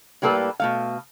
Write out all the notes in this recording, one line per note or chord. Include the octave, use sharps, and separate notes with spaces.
A2 G3 A#3 A4 B4
B2 A3 F5